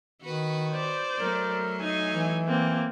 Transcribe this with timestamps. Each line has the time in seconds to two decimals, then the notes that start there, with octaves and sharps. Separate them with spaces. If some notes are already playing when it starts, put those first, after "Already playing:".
0.22 D#3 F#4 B4
0.72 C5 D5
1.18 F#3 A3 A#4
1.81 D#4 G#5
2.14 E3
2.47 A#3 C4